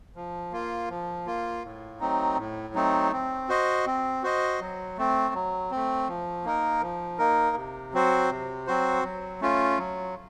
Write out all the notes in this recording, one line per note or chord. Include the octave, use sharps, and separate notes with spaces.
F3
A#3 F4
F3
A#3 F4
A2
F#3 A3 C4 D#4
A2
F#3 A3 C4 D#4
C4
F#4 C5 D#5
C4
F#4 C5 D#5
F#3
A3 C4
F#3
A3 C4
F3
A#3 D#4 A#4
F3
A#3 D#4 A#4
C3
F#3 C4 F#4 C5
C3
F#3 C4 F#4 C5
F#3
A3 C#4 F4
F#3